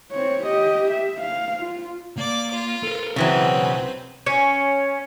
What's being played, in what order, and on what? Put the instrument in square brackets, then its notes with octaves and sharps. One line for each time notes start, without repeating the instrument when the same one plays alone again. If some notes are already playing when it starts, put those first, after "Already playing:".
[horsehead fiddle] C4 C#5
G4 D#5
E5
F5
F4
[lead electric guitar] A#3 [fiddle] D5 D6
[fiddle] F4
[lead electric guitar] A4 A#4
[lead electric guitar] B1 G5 [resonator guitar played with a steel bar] C#3 E3 F#3 [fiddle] C4 B4
[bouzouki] C#4